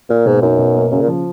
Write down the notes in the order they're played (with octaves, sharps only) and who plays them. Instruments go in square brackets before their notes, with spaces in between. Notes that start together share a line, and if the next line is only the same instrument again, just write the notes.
[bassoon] A#2 [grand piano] A#3
[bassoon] G#2 [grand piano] B2
[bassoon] F#2 [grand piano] D#4
[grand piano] B2
A#3
[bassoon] F#2 [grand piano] C#3
[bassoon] A#2
[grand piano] F3